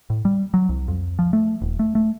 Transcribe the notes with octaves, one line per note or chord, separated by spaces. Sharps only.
A2
G3
F#3
C2
F2
F3
A3
D#1
A3
A3